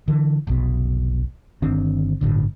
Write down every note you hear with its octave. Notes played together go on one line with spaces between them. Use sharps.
D3 E3
F1 B1 B2
G1 D#3 C4 D4
G1 A2 D3